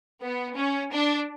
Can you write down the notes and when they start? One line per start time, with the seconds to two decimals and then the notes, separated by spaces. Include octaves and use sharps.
0.23 B3
0.57 C#4
0.92 D4